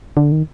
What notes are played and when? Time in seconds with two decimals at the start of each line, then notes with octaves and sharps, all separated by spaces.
0.17 D3
0.32 D#3